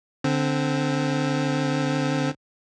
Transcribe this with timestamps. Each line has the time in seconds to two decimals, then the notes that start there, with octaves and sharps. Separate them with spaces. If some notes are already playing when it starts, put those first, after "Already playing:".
0.24 D3 C4